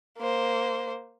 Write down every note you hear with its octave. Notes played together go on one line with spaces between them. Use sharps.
A#3 C5